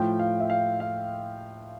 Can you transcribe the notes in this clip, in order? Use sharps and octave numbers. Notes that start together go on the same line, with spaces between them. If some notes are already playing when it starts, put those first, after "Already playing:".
Already playing: A2 F3 G5
F5
E5
F5
F5